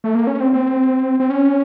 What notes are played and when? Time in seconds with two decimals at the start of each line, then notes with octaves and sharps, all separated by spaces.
0.04 A3
0.15 A#3
0.27 C#4
0.40 C4
0.53 C4
1.20 C4
1.30 C#4